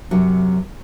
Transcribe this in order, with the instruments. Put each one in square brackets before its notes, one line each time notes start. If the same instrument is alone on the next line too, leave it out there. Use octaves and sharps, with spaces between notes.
[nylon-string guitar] F#2 C3 F#3